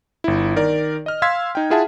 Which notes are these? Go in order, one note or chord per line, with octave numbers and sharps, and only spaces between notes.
G1 E4
D#3 A#4 D5
D#5 F6
F5 C6 E6 G#6 B6
D#4 G5
E4 F4 G#4 E5 F#5 A5